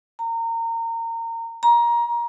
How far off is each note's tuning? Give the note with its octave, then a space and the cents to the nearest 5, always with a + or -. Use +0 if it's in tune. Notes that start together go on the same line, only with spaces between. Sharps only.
A#5 -25
A#5 +20